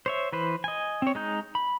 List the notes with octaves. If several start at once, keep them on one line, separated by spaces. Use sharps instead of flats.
C5 C#5 E5
E3 B4 C5
D#5 G#5
C4 C#5
G#3 D#4 G6
B5